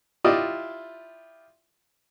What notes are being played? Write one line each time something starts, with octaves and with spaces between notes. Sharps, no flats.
E4 F4 G4 D5 D#5